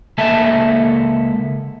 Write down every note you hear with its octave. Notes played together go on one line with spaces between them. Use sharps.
C#2 A#3 C#4 A4 E5 A5